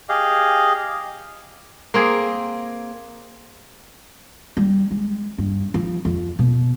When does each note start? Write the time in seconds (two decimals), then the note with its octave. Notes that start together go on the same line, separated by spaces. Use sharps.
0.09 G4 G#4 D#5 F5
1.94 A#3 C4 G#4
4.57 G3
4.91 G#3
5.38 G2
5.74 F3
6.05 F2
6.39 B2